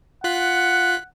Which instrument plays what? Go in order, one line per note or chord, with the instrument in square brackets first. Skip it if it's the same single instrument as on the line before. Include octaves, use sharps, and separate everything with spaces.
[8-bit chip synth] F4 F#6 B6 [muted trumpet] F#5